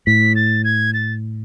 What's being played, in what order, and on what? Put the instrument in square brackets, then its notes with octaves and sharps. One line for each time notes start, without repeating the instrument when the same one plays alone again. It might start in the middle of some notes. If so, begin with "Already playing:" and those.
[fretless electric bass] A2 [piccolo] B6
[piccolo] A6
G#6
A6